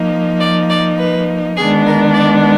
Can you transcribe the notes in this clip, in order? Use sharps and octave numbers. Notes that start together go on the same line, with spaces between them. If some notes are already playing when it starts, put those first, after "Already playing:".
Already playing: F3 A#3 D#4
D5
D5
B4
D#3 G#3 B3 D4 G#4
A#4
D5